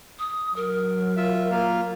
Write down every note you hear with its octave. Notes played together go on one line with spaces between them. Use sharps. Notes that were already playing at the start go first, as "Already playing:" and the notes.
D#6
F#3 A#4
F4 E5
A#3 F4 F5